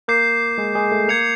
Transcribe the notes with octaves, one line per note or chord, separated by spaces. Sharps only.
A#3 A#4 D6 G6 C7
G#3 G#4
G#3 G#4
A3 A4
A#3 A#4 G#6 C#7 F7